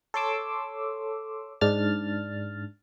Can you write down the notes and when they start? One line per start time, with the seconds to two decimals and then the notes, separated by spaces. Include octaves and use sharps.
0.14 A4 C#5 C6 D6 E6
1.61 G#2 D4 F6 A6